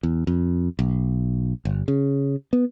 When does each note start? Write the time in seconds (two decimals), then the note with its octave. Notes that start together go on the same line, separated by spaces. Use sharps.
0.03 E2
0.27 F2
0.79 B1
1.65 G1
1.88 C#3
2.53 B3